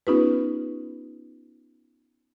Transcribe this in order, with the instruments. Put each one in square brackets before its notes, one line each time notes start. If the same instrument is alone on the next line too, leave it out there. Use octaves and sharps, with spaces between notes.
[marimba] B3 C#4 D#4 F4 G4 B4